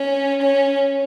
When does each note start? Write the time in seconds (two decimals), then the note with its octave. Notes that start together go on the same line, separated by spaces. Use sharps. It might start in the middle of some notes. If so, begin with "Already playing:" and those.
Already playing: C#4
0.42 C#4